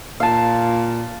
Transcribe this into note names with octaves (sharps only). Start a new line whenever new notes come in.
A#2 F5 A5